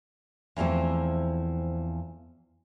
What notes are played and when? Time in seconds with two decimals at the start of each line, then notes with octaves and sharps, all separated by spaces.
0.56 E2 E3 F3 A3 C4